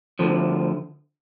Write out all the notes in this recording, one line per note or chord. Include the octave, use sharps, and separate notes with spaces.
D2 D3 F3